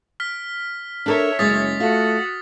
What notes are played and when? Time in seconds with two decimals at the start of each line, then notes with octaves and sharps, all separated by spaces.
0.20 F6 B6
1.06 D4 A4 A#4 C#5 E5
1.39 F#1 G#3 C#4 D#6 A6 B6
1.80 A3 F4 F#4 F#5